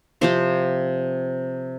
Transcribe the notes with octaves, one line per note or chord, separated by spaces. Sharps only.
C3 F3 C4 G4 C5